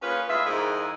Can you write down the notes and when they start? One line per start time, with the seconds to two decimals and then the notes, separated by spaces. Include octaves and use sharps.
0.02 A#3 C#4 F4 G#4 B4
0.29 A2 G#3 F4 D#5 E5
0.46 F2 G#2 G#3 E4 A#4 D#5